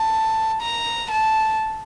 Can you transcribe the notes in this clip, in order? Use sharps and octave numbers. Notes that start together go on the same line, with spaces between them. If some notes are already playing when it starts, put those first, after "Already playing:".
Already playing: A5
A#5
A5